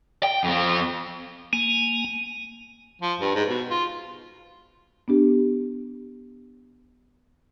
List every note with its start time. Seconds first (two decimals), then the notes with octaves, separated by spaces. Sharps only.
0.23 G5
0.44 F2 C4
1.53 A#3 G#5 D#7
3.02 F3
3.21 G2
3.35 G#2
3.49 B2
3.70 F4
5.08 B3 D4 G4